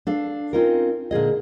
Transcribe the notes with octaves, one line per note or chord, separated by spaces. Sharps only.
D4 A4 F5
C4 C#4 D#4 F4 A#4
A#2 D3 G#4 D#5